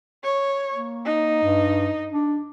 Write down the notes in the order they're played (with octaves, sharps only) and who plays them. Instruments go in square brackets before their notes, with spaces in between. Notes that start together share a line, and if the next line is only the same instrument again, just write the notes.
[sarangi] C#5
[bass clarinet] A#3
[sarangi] D#4
[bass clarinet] G2
D4